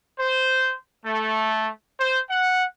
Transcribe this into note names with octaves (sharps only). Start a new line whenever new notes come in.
C5
A3
C5
F#5